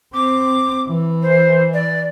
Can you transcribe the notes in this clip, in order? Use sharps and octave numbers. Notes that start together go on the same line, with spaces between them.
C4 D6
E3
C5
D5